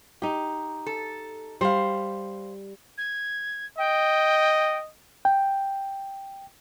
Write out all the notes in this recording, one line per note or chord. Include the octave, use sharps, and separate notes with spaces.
D#4 G4
A4
G3 C5 F5
G#6
D#5 G5
G5